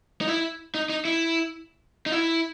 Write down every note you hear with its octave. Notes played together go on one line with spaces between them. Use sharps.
D#4
E4
D#4
D#4
E4
D#4
E4